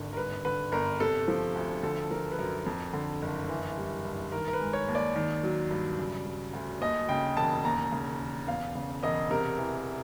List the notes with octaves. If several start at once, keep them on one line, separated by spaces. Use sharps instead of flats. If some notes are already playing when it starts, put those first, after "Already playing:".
Already playing: G#1 D3
A#4
G2 B4
D3 B4
G1 A#4
C3 A4
F3
D2
D3 A4
F3 A#4
B4
F#2 A#4
F2
D3
F#1
E3
G3
G2
D#3 A#4
A#4
B4
G#3
C#5
D#2
D5
D#3
F#3
G2
C#3
F#3
D2
D#2 D#5
C#3 G5
E1 A5
D#2 A#5
C#3
E1
E2 F5
C#3
E1 D#5
C3 A#4
E3